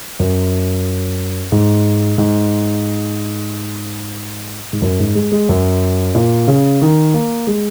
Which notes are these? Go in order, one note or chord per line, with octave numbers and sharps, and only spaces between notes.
F#2
G#2
G#2
G#2
F#2
G#2
G#3
G#3
F#2
A#2
C#3
D#3
A#3
G#3